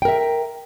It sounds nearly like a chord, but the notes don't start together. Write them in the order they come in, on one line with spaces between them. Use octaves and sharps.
G5 A#4 E5